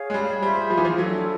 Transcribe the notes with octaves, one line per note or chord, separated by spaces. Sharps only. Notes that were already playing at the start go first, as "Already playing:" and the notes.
Already playing: G#4 C#5 F5
G#3
G3
G3 F4 G#4 C5 E5
F3
E3
F3
F#3 D4 F4 A4